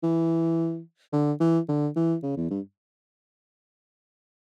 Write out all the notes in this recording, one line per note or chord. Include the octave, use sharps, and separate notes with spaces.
E3
D3
E3
D3
E3
C#3
E2
G2